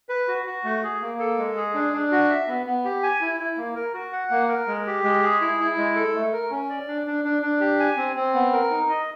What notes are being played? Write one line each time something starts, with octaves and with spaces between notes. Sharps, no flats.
B4
F#4
F#4
A3
G#4
A#3
A4
G#3
G#4
D4
D4
F#4
E5
B3
B3
G4
G#5
E4
E4
A#3
A#4
F#4
F#5
A#3
A#4
G#3
G4
G#3
G#4
E4
E4
G#3
A4
A3
A#4
C#4
D5
D4
D4
D4
D4
G4
G#5
C4
C4
B3
A#4
D#4
D#5